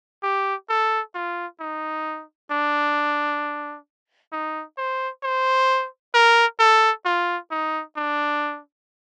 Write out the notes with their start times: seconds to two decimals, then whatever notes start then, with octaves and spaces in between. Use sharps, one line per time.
0.23 G4
0.69 A4
1.15 F4
1.60 D#4
2.51 D4
4.32 D#4
4.78 C5
5.23 C5
6.14 A#4
6.60 A4
7.06 F4
7.51 D#4
7.96 D4